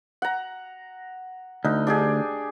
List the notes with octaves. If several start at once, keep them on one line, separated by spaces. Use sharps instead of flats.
F#5 A#5
D2 D#4
D4 G4 G#4